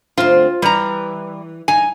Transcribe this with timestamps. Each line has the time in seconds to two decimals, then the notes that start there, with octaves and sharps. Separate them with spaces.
0.18 D2 C4 F4
0.62 E3 G3 A#5
1.68 D#4 G#5